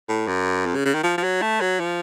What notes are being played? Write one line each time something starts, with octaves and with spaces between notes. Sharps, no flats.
A2
F#2
F2
C#3
C#3
D#3
F3
F3
F#3
A3
F#3
F3